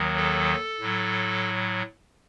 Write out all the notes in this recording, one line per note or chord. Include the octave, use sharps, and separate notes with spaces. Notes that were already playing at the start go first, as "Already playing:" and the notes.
Already playing: D#2 D#3 F#3
A4
A2 F#3